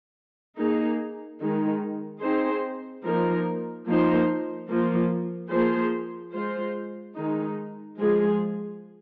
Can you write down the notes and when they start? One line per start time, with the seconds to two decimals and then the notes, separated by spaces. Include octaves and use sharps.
0.58 A#3 D#4 G#4
1.40 D#3 G#3 D#4
2.22 C4 D#4 G#4 C5
3.05 F3 A#3 D#4 A#4
3.87 F3 A#3 D#4 C5
4.69 F3 A#3 F4
5.51 F3 A#3 G#4 C5
6.33 G#3 F4 C5
7.15 D#3 G#3 D#4
7.98 F3 G#3 F4 G#4